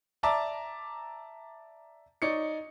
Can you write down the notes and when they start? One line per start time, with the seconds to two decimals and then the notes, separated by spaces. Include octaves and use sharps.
0.23 D5 E5 A5 A#5 D6
2.22 D#4 C#5 D5 C#7